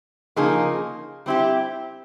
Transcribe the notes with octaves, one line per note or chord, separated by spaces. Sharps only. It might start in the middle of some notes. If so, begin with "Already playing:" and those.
C#3 F3 A#3 D#4 G#4
G3 C4 E4 G4